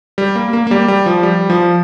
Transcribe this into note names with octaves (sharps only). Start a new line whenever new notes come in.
G3
A#3
A#3
A#3
G3
G3
F3
G3
F3